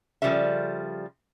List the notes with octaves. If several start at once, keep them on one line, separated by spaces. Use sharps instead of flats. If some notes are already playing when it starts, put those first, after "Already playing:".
C#3 F3 G3 G4 A4 E5